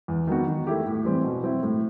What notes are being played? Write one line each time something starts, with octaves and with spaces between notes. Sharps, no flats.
E2
D#3 F#3 B3 F#4
D#3
A3 E4 G4
A2
E3 G3 C4
B2
F#3 C4 E4
A2